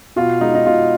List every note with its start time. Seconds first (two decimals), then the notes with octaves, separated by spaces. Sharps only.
0.16 B2 F4
0.41 G#3 D#4
0.55 D#4
0.66 B2 F4